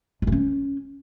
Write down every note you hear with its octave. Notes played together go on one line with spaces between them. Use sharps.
G#3
E3
C#4